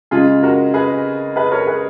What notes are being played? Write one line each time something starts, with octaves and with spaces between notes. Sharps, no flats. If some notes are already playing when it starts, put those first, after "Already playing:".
C#3 G#3 F4 G#4
F#4 A#4
G#4 B4
G#4 B4
A#4 C#5
G#4 B4